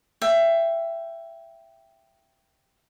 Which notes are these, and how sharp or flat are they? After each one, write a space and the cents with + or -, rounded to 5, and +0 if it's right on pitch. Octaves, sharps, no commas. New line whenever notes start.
E5 +20 G5 +0